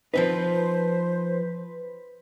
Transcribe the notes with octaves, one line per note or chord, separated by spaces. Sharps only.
F3 C4 D#4 B4 C5